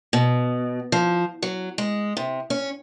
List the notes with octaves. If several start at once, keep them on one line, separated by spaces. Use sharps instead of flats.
B2
F3
F#3
G#3
C3
C#4